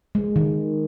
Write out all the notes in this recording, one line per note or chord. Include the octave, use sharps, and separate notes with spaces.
G#3
D#3